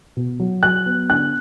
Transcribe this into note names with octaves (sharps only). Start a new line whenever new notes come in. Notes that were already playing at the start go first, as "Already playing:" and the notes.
B2
F#3
F#3 F#6
B3
D3 F#6